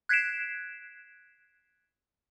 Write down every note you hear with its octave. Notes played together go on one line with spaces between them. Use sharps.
F#6 G#6 B6 C7 D7 E7